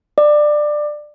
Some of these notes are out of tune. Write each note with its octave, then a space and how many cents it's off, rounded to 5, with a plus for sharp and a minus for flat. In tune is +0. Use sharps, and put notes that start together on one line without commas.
D5 +20